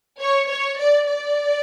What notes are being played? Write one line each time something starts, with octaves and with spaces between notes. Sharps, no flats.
C#5
C#5
D5
D5